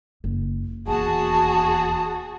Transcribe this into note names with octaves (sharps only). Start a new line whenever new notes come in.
F#1
D#1 E2 F#4 G#4 A5